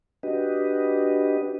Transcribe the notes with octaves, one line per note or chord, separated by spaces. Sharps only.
D4 F#4 G4 B4 D#5